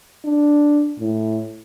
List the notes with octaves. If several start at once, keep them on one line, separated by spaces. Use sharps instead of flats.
D4
A2